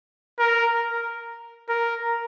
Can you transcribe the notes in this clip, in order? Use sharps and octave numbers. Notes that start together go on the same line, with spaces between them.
A#4
A#4